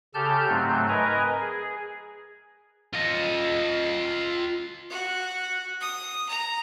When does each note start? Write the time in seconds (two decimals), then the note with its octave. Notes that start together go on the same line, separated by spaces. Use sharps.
0.14 C#3 G4 A4 A5 F6 G6
0.49 G#2 F#3 A3 C4
0.89 A#4 B4 D#5 G#5 A#5
1.40 G#4
2.94 F4 D#5
4.90 F#4
5.81 D#6
6.28 A#5